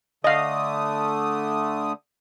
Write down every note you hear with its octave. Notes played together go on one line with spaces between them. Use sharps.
D3 A3 D#5 F5 D#6